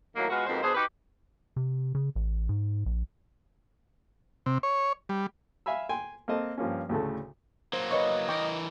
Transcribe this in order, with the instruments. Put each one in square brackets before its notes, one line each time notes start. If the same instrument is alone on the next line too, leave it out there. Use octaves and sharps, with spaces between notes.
[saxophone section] A2 D#3 F#3 A#3
G#3 B3 F4 F#4
F2 G#2 B2 A#3 C5
B2 D4 G#4 C5
D#4 F#4 G4 B4
[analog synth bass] C3
C#3
A1
G#2
A#1
[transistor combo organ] C3
C#5
G3
[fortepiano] E5 F5 G#5 B5 E6
G5 G#5 C6
A#3 C4 A4 D#5 A5
G2 F3 A#3 C#4
D2 A2 C#3 A3
[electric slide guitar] F#3 A#3 [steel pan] C5
[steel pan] B4 C#5 C#6 [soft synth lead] D#5
[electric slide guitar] E3 A#4 [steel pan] G5 C#6 D6